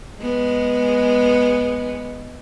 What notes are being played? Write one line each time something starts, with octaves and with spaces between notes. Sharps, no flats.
G#3 B3